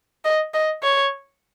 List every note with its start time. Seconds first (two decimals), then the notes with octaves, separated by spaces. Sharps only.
0.25 D#5
0.54 D#5
0.83 C#5